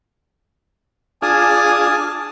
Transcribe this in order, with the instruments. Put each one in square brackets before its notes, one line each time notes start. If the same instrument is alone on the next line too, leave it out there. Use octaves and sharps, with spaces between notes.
[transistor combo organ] D4 F4 G#4 [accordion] G#5 A5 D#6